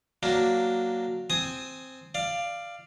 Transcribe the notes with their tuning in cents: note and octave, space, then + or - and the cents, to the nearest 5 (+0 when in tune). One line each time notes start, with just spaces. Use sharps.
F#3 +0 A#3 +0 D4 +0
C4 +0 G#5 +10 D#6 +0
D5 +15 F5 -10